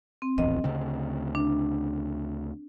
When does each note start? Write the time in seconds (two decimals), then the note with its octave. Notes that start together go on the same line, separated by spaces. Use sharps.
0.22 C4
0.38 D1 A#1 E2 D#5
0.64 D2 C#3 C4
1.35 D4